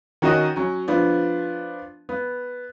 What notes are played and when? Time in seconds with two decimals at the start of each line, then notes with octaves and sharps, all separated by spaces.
0.22 D#3 C#4 F#4 A#4 D#5
0.56 F#3 C#4
0.88 F3 B3 D4
2.09 B3